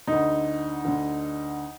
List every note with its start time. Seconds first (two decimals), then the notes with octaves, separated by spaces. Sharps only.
0.07 D2 D3 D#4
0.85 D2 D3